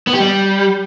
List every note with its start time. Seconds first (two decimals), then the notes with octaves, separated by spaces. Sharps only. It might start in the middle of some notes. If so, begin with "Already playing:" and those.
0.07 B3
0.13 G4
0.20 G3